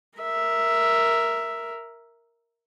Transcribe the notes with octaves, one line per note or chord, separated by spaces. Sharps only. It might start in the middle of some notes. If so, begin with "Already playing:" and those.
A#4 E5